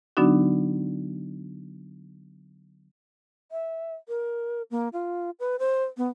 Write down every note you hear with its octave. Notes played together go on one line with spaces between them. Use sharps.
D3 F#3 B3 D4 D#4 F#4
E5
A#4
A#3
F4
B4
C5
B3